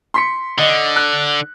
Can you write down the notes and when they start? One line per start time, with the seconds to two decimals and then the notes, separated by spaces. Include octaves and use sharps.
0.14 C6 B6 C#7
0.58 D3 D#5
0.96 F#6